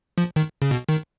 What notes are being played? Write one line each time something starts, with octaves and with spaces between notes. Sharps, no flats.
F3
D#3
C#3
B2
D#3